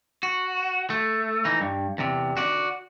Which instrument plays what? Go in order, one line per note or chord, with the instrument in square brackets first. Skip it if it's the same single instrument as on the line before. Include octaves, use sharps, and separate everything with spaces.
[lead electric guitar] F#4
A3
E3 D#4
G2
E2 C3
F#4 D5